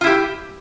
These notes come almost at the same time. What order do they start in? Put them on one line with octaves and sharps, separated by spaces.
F4 E4 G4